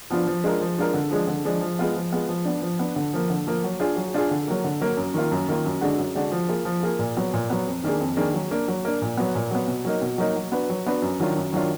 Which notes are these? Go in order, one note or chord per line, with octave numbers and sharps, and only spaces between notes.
F3 B3 D4 F4
F3
G#3 D4 F4 A#4
F3
G#3 D4 F4 A#4
D3
F3 G#3 D4
D3
F3 G#3 D4
F3
G#3 B3 F4
F3
G#3 B3 F4
F3
B3 D4
F3
B3 D4
D3
F3 A#3
D3
F3 A#3
F#3
D4 F4 G#4
F#3
D4 F4 G#4
D3
F#3 A#3
D3
F#3 A#3
F#2
D#3 A#3 F4
F#2
D#3 A#3 F4
F#2
D3 G#3 D4 F#4
F#2
D3 G#3 D4 F#4
F3
A#3 F4 G#4
F3
A#3 F4 G#4
A#2
F#3 B3
A#2
F#3 B3
F2
D#3 A#3 D4 G#4
F2
D#3 A#3 D4 G#4
F#3
A#3 D4
F#3
A#3 D4
A#2
F#3 B3
A#2
F#3 B3
B2
F#3 A#3 D#4
B2
F#3 A#3 D#4
F#3
B3 D4 F#4 B4
F#3
B3 D4 F#4 B4
F#2
D#3 F#3 D4 F4
F#2
D#3 F#3 D4 F4